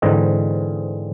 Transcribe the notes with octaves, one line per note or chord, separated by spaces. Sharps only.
G#2 D3 E3 C4 D#5